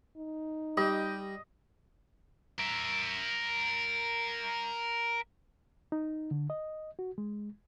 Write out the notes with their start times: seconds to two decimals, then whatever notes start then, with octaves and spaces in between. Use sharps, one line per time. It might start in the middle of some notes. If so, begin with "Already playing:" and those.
0.16 D#4
0.77 G3 G4 D#5
2.59 A#4 E5
5.92 D#4
6.31 D3
6.50 D#5
6.99 F#4
7.18 G#3